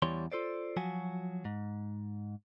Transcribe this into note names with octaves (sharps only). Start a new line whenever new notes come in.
E2 E3 G3 C#5 C6
F4 A4 C5 D5
F3 F#3 F#4 G#5
G#2